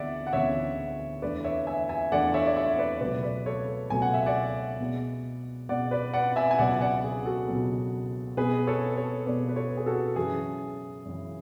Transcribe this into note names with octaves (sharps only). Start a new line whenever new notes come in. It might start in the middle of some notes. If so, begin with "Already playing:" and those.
Already playing: D2 E3 G#3 B3 D5 E5 F#5
F#5
D2 C#3 E3 G#3 B3 C#5 E5
E2 D3 A3 B4 D5
D5
C#5 E5
E5 G#5
E5 G#5
E2 D3 A3 D5 F#5
C#5 E5
D5
C#5 E5
B4 D5
C#2 B2 F#3 A3 B4 D5
B4 D5
A4 C#5
C#2 B2 F#3 A3 G#5
F#5
E5
D5 F#5
B2 G#3 B3
B2 G#3 B3 D5 F#5
B4 D5
D5 F#5
E5 G#5
G#5
C#2 B2 F#3 B3 D5 F#5
D5 F#5
G#4
F#4 A4
C#2 B2 F#3 B3
B2 G#3 B3 G#4 B4
A4 C#5
A4 C#5
B2 G#3 B3 B4 D5
B4
A4 C#5
G#4
F#4 A4
F#2 C#3 E3 G#4
F#2 C#3 E3